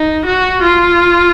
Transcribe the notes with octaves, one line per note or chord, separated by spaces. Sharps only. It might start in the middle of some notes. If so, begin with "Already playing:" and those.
Already playing: D#4
F#4
F4